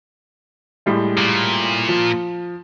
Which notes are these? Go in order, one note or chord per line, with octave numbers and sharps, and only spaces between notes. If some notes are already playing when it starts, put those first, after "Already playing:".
A2 G3 G#3
A#2
F3